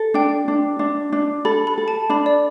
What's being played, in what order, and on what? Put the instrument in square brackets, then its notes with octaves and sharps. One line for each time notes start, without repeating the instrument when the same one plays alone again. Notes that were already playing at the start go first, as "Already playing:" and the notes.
Already playing: [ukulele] A4
[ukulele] D4 [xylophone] G5
[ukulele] D4
D4
D4
[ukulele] A4 [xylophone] B5
[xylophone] B5
[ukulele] A4
[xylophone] A5
[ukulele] D4 [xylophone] B5
[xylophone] D5